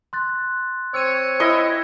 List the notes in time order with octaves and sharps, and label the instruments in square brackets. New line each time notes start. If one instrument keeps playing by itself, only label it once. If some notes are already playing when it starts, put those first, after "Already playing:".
[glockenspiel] C6 F#6 A6
[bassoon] C4 [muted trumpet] C#5 [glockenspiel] E6 D#7
[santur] E4 D#5